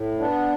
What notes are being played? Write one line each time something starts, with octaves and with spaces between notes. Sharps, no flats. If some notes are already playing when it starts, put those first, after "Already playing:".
Already playing: A2
B3 D4